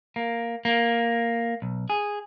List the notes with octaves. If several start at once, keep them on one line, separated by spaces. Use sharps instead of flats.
A#3
A#3
B1
G#4